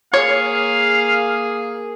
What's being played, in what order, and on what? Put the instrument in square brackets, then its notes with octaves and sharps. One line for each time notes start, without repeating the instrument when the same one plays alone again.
[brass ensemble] A#3 G#4 [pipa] C#5 [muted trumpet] F5